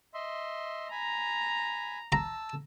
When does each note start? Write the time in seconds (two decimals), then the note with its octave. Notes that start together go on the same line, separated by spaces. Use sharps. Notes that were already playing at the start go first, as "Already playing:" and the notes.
0.14 D#5 E5 C6
0.91 G#5 A#5 B5
2.12 A5 A#5 E6